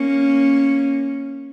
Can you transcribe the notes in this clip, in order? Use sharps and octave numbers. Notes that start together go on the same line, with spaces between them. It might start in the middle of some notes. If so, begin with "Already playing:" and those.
Already playing: A#3 C#4